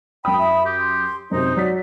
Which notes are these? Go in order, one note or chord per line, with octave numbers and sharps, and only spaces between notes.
F#2 G5 B5 D#6
E5
G4
C6
F#2 C3 D#4 C5
F#3 D5 B6